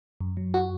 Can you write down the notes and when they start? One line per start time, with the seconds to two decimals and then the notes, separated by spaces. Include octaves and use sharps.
0.21 F#2
0.37 F#3
0.54 F#4